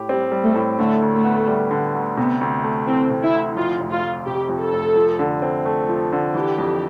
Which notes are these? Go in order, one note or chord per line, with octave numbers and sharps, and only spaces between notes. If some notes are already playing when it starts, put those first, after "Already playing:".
Already playing: A2 G4
G3 C4
G3
A3
A2
D3 A3
D2
A3
B3
G3
D3
D2
C3 B3
D2
A3
E3 C4
C3
E4
D2
F2 F4
F1
F4
F1
C3 G4
F2
A4
F1
F3
D3
C4
A3
F3
D3
E3 G4
F2